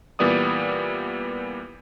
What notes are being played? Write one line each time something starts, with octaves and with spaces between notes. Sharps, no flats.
A#2 E3 G3 B3 D5 D#6